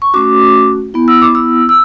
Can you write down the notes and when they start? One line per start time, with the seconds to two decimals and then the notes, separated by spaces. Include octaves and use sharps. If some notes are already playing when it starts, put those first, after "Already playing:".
0.02 C#6
0.14 A3 C#4 F#4 D6
0.94 B3 E4
1.08 E6
1.22 D6
1.35 E6
1.69 E6